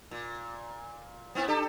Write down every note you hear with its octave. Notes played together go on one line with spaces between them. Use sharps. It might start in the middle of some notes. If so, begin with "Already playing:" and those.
A#2
B3 C4 E4
D4 G4 A4